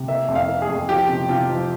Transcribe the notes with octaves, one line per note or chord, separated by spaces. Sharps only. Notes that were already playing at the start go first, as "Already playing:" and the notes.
Already playing: C3
A#3 E5
F2
F5
A#3
G#4
F2
F3 G4
C3
C3 F4
F3